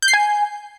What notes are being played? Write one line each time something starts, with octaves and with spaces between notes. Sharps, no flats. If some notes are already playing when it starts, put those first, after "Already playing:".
G6
C7
G#5